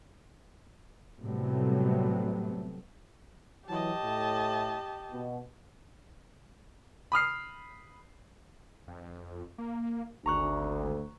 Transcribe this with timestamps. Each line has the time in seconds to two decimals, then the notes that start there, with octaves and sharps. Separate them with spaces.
1.20 A2 C3 F#3 G3 A3 B3
3.68 E3 F#3 G4 D#5 A5
4.03 A2
5.11 B2
7.12 B5 D#6 F6 C7
8.88 F2
9.58 A#3
10.26 G#1 D2 A#5 C#6 F#6